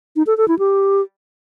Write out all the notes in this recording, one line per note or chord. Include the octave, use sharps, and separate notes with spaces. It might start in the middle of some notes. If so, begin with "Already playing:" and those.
D#4
A4
A4
E4
G4